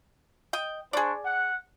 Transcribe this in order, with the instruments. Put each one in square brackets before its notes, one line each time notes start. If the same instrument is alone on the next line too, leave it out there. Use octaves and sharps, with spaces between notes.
[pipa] D#5 G5
[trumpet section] D4 C5 C#6 [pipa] G#4 D5
[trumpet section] F#5